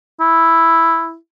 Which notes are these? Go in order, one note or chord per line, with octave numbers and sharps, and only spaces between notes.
E4